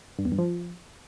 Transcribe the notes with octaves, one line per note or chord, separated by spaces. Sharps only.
G2
E2
G2
F3